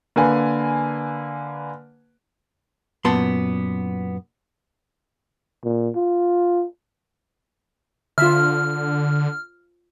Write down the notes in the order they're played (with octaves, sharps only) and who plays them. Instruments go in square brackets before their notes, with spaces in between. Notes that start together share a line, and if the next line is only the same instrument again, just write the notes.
[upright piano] D3 A#3 B4 G#5
[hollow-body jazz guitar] F#2 A#2 B3 A5 C6
[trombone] A#2
F4
[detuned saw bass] D3 [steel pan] F4 E5 [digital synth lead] F6